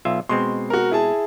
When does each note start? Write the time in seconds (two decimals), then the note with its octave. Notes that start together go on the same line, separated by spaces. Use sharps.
0.05 B1 F4 E5
0.29 B2 G#3 C4 C6
0.70 F#4 A#4
0.91 E4 G#4 A5